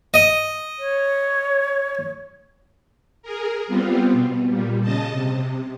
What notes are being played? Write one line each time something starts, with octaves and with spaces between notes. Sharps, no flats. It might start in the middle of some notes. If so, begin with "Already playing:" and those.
D#5
C#5
G#4 A#4
G3 B3 C4 F4
B2
A#2 G3
C#3 D#5 A5
C3